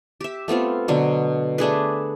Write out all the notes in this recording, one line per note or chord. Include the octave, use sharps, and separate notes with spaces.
G4 E5
A3 B3 C4 F4
B2 D3 F#3
A3 D4 G#4 B4